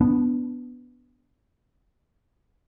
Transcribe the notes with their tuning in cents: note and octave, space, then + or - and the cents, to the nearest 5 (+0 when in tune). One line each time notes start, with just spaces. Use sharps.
B3 +0 D4 -10